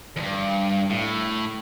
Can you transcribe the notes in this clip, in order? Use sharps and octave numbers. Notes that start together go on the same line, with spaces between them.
E2 G2
A2